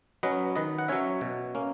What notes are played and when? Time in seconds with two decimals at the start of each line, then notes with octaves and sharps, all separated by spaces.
0.23 F#3 C#4 B4 D#5
0.56 D#3 B4 D#5
0.79 F#5
0.88 F#3 C#4 C#5 E5
1.21 B2
1.55 A#3 C#4